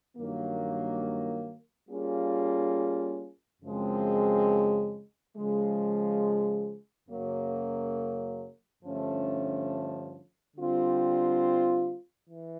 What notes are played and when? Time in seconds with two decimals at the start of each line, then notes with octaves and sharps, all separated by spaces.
0.16 G2 D#3 F#3 A#3
1.89 G3 A#3 C#4 F4 G#4
3.62 F#2 C#3 F3 G#3 C4
5.36 C#3 F3 G#3
7.09 F#2 C#3 F#3 A#3
8.83 G2 D3 F3 A3 C#4
10.56 D3 G3 C4 F4
12.29 E3